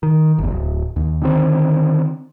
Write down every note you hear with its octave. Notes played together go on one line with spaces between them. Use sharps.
D#3
G1 E2
D1
D#2
D3 D#3 C4